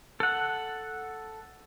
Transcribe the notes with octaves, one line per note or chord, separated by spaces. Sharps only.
A4 F#5